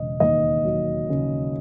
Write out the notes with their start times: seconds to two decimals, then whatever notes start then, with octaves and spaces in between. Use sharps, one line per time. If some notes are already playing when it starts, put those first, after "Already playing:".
Already playing: E1 C#3 D#5
0.20 D#2 D#5
0.65 F#3
1.09 C#3